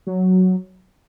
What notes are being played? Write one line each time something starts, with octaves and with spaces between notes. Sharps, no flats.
F#3